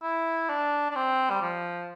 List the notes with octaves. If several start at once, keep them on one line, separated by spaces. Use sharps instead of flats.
E4
D4
D4
C4
G3
F3